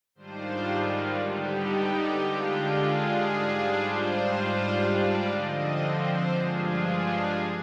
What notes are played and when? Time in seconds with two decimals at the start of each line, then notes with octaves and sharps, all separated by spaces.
0.15 G#2 D#3 G3 D4 F4 C5
1.18 D3 G3 B3 D#4 G4
2.21 D3 G#3 D4 F4
2.72 G#4
3.23 G#2 G3 D4 F4
3.74 C5
4.26 G#2 G3 D4 F4
4.78 D5
5.29 D3 F3 C4 D#5
5.80 C5
6.32 G2 F3 G#3 D4 F4 G#4
6.83 G#4